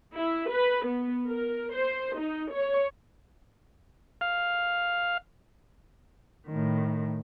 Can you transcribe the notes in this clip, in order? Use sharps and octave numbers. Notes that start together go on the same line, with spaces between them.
E4
B4
B3
A#4
C5
D#4
C#5
F5
A2 D#3